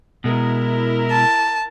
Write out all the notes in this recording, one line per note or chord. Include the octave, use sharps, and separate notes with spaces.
B2 G#3 E4 A#4 A#5
A5